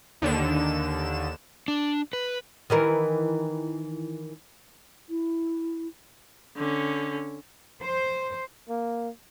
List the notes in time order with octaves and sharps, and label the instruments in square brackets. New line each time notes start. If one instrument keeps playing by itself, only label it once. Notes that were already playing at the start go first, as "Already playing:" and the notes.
[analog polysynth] D#2 D3 E7
[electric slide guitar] D4
B4
[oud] D#3 E3 A#4
[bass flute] E4
[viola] D3 C#4
[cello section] C5
[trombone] A#3